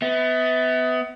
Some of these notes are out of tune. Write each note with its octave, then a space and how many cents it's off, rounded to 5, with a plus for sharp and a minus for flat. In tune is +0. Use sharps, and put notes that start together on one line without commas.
B3 +25 E5 -30